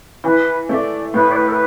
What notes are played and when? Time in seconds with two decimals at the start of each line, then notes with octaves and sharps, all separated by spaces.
0.24 E3 B4
0.69 A3 E5
0.74 D5
1.14 A2 B4
1.31 D5
1.35 B4
1.48 A4
1.52 B4